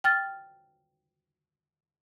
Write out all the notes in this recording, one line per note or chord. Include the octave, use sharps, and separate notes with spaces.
G5 F6 A6